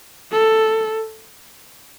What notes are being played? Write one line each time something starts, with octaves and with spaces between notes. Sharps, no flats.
A4